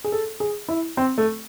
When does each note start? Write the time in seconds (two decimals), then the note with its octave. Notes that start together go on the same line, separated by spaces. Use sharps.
0.04 G#4
0.12 A4
0.40 G#4
0.69 E4
0.97 C4
1.18 A3